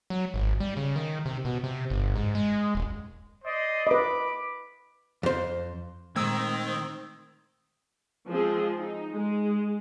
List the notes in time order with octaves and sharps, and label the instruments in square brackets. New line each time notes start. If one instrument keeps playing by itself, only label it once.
[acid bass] F#3
G#1
G3
C#3
D#3
C3
B2
C3
G1
G#2
G#3
D#1
[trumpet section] C5 D5 D#5
[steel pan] B4 D#5 [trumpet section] B5 D6
[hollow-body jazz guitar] F2 C5
[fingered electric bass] A#2 G#3 A3 [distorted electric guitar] D#3 [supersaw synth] C4 [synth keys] D#6 E6 G#6
[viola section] F3 G#3 C4 G#4
D#4
G#3